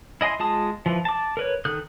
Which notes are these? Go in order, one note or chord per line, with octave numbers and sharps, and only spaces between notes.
E4 D#5 G#5 C6
G#3 F4 A5 D#6
E3 F3
A5 D6
A#4 B4 C#5
D#3 A4 D#6 F#6 G6